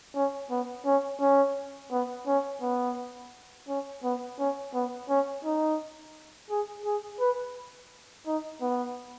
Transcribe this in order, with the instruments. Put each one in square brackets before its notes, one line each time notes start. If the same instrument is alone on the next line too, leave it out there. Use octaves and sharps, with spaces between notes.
[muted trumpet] C#4
B3
C#4
C#4
B3
C#4
B3
C#4
B3
C#4
B3
C#4
D#4
G#4
G#4
B4
D#4
B3